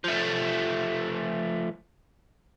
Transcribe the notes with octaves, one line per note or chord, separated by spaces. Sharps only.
F3 A3